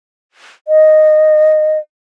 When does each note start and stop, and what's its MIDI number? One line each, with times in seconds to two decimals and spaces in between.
0.68 1.78 75